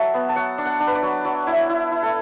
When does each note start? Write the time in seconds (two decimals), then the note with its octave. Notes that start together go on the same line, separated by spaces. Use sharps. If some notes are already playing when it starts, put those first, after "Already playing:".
Already playing: F#3 E5 F#5 A5
0.14 B3
0.29 A5
0.36 F#3 F#5
0.58 D4
0.65 F#5
0.80 D4
0.87 B4
0.95 D5
1.03 F#3
1.25 F#3
1.47 E4
1.69 E4
1.91 E4
2.03 A4